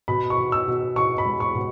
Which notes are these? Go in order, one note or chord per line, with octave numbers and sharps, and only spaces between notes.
B2 B5
C#6
B2
E6
B2
B2 C#6
B5
G#3
C#6
B2